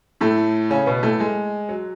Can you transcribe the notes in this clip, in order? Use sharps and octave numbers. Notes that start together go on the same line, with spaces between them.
A2 A3
C#3 C#4
B2 B3
A2 A3
G#3
F#3